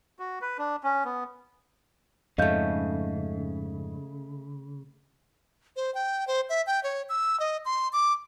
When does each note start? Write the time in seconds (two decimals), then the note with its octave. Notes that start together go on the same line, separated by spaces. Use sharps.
0.19 F#4
0.42 B4
0.58 D4
0.84 C#4
1.05 B3
2.38 F2 G#2 C#3 A3 C#4 D#5 F5 G6
5.76 C5
5.95 G5
6.28 C5
6.50 E5
6.67 G5
6.83 C#5
7.09 E6
7.40 D#5
7.65 C6
7.93 D6